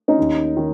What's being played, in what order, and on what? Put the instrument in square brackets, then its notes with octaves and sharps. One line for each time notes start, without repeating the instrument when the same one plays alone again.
[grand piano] C#4 D#4
D#2 D#3
D#3